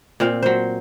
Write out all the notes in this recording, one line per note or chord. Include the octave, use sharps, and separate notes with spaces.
A#2 C4 F5
F#3 C5